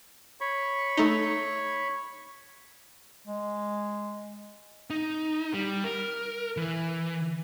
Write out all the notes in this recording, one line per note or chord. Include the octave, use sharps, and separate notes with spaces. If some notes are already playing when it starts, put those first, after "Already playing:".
C#5 B5 C#6
A3 D#4
G#3
D#4
G3
A#4
E3